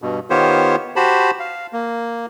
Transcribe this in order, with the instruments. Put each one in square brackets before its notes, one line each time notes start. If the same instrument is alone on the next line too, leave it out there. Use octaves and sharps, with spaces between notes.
[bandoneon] G2 B2
D#3 B3 F4 G4 C5 C#5
F#4 G4 C5 A5 B5
F5
A#3